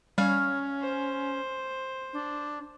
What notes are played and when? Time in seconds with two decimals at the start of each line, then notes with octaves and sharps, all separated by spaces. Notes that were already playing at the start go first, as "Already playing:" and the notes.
0.18 G3 C#4 C#5 F5
0.82 C5
2.13 D4